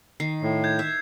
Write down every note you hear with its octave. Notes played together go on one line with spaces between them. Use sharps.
D#3 C7
A2
G6 G#6
E5